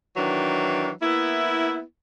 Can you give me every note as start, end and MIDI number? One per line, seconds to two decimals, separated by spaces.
0.17 0.90 51
0.17 0.90 52
0.17 0.90 54
0.17 0.90 62
1.02 1.82 58
1.02 1.82 59
1.02 1.82 64